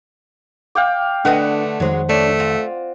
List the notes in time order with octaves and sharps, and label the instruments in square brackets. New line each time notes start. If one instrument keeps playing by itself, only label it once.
[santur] F5 G5 D6
[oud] D3 B4 D#5 [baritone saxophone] A3 [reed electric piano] D4 [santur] F#5
[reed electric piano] F2 D#3 C5 [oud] F#3 G#3
[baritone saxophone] A3 [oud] C#4 D4
[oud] C4 F4